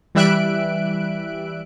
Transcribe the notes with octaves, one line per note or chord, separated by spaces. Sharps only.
E3 G3 E5 F#6 D7